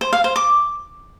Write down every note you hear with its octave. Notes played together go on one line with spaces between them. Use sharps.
C5
F5
C5
D6